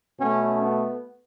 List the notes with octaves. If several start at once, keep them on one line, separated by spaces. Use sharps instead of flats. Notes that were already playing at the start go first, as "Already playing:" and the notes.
B2 A3 C#4
B3